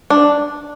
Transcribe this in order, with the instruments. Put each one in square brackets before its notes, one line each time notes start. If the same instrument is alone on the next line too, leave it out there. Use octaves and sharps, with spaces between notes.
[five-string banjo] D4